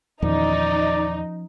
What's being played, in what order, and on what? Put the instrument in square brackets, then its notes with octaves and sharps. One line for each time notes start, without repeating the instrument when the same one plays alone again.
[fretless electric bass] E2 A#2 D#3 [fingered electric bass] F3 C#4 [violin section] D#4 [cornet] D5